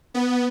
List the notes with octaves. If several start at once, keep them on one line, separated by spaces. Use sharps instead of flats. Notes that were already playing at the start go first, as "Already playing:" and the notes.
B3